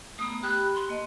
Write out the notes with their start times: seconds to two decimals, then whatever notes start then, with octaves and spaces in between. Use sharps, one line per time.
0.19 A3 B3 A#5 D#6
0.43 G4 G5 B5 F#6
0.75 C6
0.89 A#3 D#5 A5